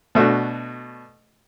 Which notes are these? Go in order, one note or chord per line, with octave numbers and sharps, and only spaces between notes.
B2 A3 D4 F#4